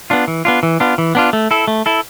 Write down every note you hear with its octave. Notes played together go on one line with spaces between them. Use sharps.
B3 D4 F4
E3
B3 D4 F4
E3
B3 D4 F4
E3
B3 D4 F4
A3
E4 A4
A3
E4 A4